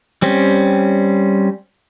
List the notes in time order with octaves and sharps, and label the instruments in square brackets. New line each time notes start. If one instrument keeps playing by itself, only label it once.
[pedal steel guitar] G3 C4 C#4